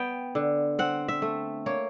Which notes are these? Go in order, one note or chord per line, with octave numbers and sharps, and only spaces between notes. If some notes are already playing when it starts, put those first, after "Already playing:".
Already playing: B3 G5
D3
C4 F#5
E5
A3
A#3 C#5